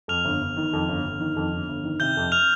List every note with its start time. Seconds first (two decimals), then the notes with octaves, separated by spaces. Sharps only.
0.08 F2 F6 F7
0.25 G1
0.41 G1
0.56 D#3
0.73 F2
0.88 G1
1.05 G1
1.20 D#3
1.36 F2
1.52 G1
1.69 G1
1.84 D#3
2.00 C3 G6 G7
2.17 F2
2.32 F6 F7